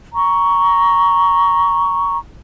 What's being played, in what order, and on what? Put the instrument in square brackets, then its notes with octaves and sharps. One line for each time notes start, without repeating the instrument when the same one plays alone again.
[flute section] A#5 C#6